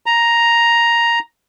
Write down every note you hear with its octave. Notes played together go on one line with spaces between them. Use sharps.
A#5